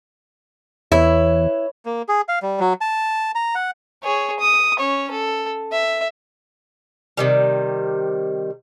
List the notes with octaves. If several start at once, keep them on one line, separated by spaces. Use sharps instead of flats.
E2 E4 B4 C#5
A#3
G#4
F5
G3
F#3
A5
A#5
F#5
G#4 C#5
D#6
C#4 C#5
A4
E5
C3 D#3 G3